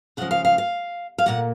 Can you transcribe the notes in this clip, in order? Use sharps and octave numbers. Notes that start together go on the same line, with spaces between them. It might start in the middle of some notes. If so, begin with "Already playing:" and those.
D#2 C#3 F3 G#3 F#5
F5
F5
F5
F5
A#2 F#3 A#3 F#5